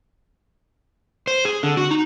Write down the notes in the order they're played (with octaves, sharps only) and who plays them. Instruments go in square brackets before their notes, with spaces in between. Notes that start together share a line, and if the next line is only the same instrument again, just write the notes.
[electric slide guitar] C5
G#4
D3
F#4
D#4